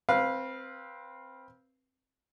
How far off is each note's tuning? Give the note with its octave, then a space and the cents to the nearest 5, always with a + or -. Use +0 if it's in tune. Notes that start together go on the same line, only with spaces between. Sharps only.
C4 +0 B4 -20 F5 +0